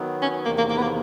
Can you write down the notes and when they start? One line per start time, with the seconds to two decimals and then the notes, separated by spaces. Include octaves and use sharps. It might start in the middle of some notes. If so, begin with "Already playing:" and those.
Already playing: D#3 F#3 B3
0.22 C#4
0.45 E2 C3 D#3 A#3
0.58 A#3
0.70 A#3
0.77 B3
0.82 A#3